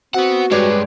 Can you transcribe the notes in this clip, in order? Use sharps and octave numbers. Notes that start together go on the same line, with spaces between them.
B3 C4 F#4 F#5
G2 G#3 G4 B4 C#5 D5